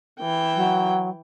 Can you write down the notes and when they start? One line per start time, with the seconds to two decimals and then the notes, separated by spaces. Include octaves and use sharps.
0.20 E3 G5
0.55 F#3